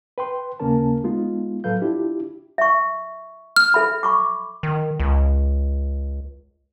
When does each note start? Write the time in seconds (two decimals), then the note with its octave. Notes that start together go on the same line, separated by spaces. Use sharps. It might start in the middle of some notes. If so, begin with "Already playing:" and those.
0.18 B4 G5 C6
0.60 D#2 C#3 A#3 C#4 A#4 A5
1.04 G#3 B3 D#4 F4
1.64 A2 F#3 A4 B4 F5 G6
1.82 D4 E4 F4 G4
2.58 E5 C#6
3.56 F6
3.74 A4 E5 B5
4.03 B5 C#6 D6
4.63 D#3
5.00 C#2